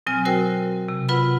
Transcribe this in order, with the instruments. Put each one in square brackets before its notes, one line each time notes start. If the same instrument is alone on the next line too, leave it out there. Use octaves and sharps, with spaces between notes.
[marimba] B2 F#3 C4 G#5 F6
F#4 A#4 C5 G5 E6
C3
F4 B4 F#5 B5